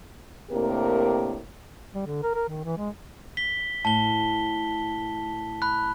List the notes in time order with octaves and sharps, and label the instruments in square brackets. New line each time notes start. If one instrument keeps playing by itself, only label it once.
[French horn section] A2 C3 A#3 D4 G4 A#4
[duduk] G3
D3
A#4
A#4
D#3
E3
G#3
[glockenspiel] B6 G7
[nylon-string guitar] A2 [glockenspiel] A5 G7
[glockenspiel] B5 F#6